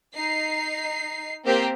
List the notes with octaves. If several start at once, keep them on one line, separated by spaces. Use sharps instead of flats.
D#4 C7
A#3 C4 G4 A#4 C5